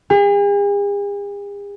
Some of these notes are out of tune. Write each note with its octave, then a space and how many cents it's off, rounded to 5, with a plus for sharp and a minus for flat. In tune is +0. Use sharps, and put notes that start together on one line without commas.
G#4 -45